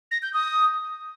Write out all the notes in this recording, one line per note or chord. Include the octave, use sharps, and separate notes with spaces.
A#6
G6
D#6